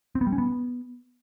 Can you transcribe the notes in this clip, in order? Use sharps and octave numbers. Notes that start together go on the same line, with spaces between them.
C4
B3
G3
C#4
B3